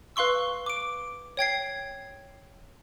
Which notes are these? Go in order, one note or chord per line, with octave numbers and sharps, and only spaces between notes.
B4 F5 C6 C#6 E6
D6 D7
C#5 G5 G#6 C7